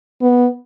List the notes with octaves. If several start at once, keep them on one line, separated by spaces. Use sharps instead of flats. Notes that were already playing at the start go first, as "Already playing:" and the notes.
B3